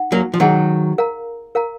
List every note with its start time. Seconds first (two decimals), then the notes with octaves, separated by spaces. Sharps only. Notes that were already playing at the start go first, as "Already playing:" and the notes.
Already playing: D#4 F#5
0.12 F#3 A#3
0.34 F3
0.40 D#3 F#3 D#4 G#4 D#5 F#5
0.98 A#4 F5 A#5
1.55 A#4 F5 A#5